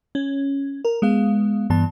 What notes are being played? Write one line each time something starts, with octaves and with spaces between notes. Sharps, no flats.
C#4
A#4
G#3 B3 F5
G2 E3 B3 A5